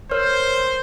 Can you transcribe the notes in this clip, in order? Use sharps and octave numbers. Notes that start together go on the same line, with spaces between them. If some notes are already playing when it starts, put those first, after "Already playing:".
A#4 C5 C#5 F6